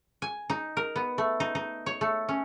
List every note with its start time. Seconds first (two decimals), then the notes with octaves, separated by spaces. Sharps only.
0.22 G#5
0.50 D#4
0.77 A#4
0.96 B3
1.18 A3
1.40 D#4
1.55 D#4
1.86 C#5
2.01 A3
2.29 C#4